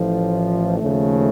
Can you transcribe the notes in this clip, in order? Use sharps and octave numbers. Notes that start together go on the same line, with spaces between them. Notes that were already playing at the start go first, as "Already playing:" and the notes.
Already playing: A1 A2 F3
D#2 C#3 F3 A3